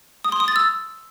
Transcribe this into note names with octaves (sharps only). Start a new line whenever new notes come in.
D#6
C6
D#6
A6
E6